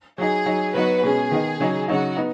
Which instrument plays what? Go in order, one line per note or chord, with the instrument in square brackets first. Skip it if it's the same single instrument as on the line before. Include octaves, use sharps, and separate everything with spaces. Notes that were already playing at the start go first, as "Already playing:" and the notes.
[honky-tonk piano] F#3 D#4 [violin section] G#4
[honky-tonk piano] F#3 D#4
[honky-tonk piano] F#3 B3 D#4 [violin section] F#4 B4
[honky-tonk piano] B2 G#3 C#4 [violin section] G#4
[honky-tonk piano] D#3 B3 D#4
C#3 F#3 D#4
[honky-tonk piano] C#3 F#3 D#4 [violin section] F#4
[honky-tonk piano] B3 D#4